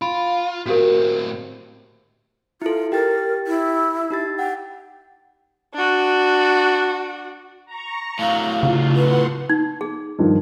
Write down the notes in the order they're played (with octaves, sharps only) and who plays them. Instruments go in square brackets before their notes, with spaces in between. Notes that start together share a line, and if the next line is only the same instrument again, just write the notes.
[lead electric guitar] F4 [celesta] B5 C6 D7
[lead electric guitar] A2 C4 [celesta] F#4 G4 A#4
[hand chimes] E4 A4 [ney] F4
[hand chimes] G4 G5 A6 [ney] A#4
[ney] E4
[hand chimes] D#4 G4 A6
[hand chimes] F#5 [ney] G5
[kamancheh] D4 F#4
[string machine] A#5 C#6
[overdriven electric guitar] A2 F#3 [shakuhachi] F5
[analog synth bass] C#3 [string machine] F4
[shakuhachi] B4 [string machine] F#5 C6
[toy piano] D#4
G#4
[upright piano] G2 D#3 F3